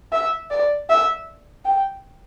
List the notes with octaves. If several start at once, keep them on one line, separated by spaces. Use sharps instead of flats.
E5
D5
E5
G5